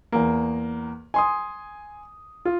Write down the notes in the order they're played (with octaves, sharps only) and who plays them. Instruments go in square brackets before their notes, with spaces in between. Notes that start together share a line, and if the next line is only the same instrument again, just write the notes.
[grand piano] E2 A#3
G#5 C6 D#6
F4